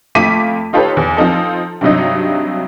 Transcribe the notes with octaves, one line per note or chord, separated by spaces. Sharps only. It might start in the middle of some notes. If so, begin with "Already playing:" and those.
F2 A3 F4 D6 B6 D#7
D#4 F4 G4 A4 B4 C#5
E2
F3 C4 D#4 A4
G2 C3 F#3 D#4